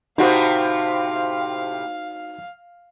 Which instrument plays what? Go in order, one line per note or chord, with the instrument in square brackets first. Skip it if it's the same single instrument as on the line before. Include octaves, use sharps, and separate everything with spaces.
[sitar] A2 C3 A#3 [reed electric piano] D#4 F#4 C5 [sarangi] F5